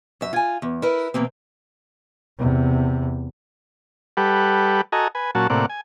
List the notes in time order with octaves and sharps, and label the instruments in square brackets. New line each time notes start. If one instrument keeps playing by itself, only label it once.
[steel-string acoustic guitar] F#2 E5
F4 G#5
E2
E4 A#4 B4
B2 E3 A#3 C4
[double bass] E2 C3
[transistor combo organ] G3 G4 A4 B4 F#5
F#4 A4 D#5 G#5 A#5
B4 G#5
A#2 F#3 C#4 F#4 A5
A2 C3 A#3 D5 F#5
G#5